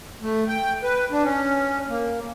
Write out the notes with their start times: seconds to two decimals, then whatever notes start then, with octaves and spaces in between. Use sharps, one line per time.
0.22 A3
0.48 G5
0.83 B4
1.11 D4
1.24 C#4
1.89 A#3